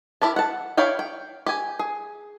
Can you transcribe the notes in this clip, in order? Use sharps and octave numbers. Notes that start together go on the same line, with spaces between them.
E4 G4 A#4 A5
F#5 A5
E4 C#5 D5 F5 G5
G5
G4 G#5
G#4